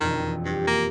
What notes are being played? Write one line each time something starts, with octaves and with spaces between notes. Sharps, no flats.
E1 F2 D#3
G2 G4
A#3